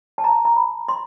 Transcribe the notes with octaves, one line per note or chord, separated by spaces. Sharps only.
A5
A#5
A#5
B5
C6